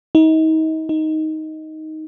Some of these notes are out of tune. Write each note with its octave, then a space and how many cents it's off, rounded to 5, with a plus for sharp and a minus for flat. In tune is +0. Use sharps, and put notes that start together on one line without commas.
D#4 +35
D#4 +10